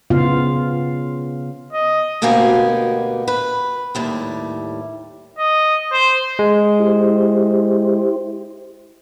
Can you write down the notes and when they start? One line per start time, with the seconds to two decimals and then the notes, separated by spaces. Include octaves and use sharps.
0.10 C#3 B3 F4 F5
1.73 D#5
2.22 D2 B2 A#3 B3 G4 G#5
3.28 B4
3.95 D#2 A2 G3
5.39 D#5
5.92 C5
6.39 G#3
6.80 E4 G4 C5